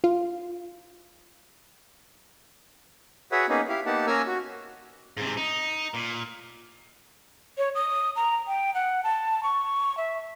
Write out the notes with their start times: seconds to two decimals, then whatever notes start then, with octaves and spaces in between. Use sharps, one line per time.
0.04 F4
3.32 F#4 G#4 B4 C#5 E5 F#5
3.49 A#3 B3 C#4 D#4 G#4
3.69 E4 G4 F5
3.86 A#3 B3 D#4 G4 F#5 A5
4.07 A#3 C#4 A#4 G#5 A#5 E6
4.27 F#4
5.17 G#2 C3
5.37 D#4
5.94 A#2
7.58 C#5
7.75 D#6
8.16 A#5
8.47 G5
8.74 F#5
9.04 A5
9.43 C#6
9.97 E5